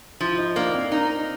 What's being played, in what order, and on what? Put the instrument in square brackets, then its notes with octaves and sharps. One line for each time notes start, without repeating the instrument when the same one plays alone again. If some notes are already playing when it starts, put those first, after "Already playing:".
[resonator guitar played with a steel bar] F3 [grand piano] E4
[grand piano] E4
D#4
[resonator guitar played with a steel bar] A#3 [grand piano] D4
[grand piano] C4
[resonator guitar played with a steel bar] D#4